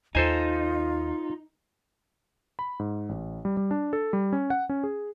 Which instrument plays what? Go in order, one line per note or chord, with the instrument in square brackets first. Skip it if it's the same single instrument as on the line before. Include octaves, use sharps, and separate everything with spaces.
[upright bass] D#2 [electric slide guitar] D#4 [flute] F4 [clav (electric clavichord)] A4 C5 G#5
[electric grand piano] B5
G#2
A1
G3
G3
D4
A4
G3
C#4
F#5
C#4
G#4